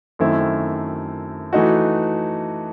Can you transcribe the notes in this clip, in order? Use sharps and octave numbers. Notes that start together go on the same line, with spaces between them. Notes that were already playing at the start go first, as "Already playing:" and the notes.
F#2 D#3 A3 C4 E4
E3 A3 D#4 F#4